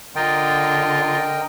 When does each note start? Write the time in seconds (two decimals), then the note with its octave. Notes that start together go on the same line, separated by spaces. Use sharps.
0.16 D3 F4 A#4 D#5 G5